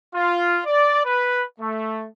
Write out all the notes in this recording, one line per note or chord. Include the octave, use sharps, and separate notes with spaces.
F4
D5
B4
A3